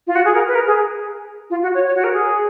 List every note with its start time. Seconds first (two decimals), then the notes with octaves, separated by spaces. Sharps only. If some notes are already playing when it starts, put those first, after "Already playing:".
0.07 F4
0.15 F#4
0.25 G#4
0.34 A#4
0.47 B4
0.55 A#4
0.67 G#4
1.50 F4
1.62 F#4
1.74 C#5
1.86 C#5
1.96 F#4
2.04 A#4
2.13 G#4